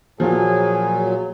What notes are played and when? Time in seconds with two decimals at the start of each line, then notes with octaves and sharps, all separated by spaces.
0.20 A#2 F3 F#3 F4 G#4